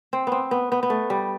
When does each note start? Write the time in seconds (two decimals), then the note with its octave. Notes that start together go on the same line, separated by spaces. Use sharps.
0.13 C4
0.27 B3 C4
0.51 B3
0.72 B3
0.83 B3
0.90 A3
1.10 G3